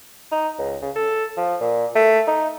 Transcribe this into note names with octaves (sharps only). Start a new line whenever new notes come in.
D#4
C#2
C#3
A4
F3
A#2
A3
D#4